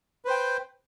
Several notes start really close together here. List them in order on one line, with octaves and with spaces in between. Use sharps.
B4 C5 G5